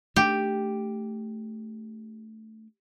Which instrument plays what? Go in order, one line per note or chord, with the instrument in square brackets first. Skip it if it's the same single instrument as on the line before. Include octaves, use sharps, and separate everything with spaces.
[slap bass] A3 D4 [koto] G4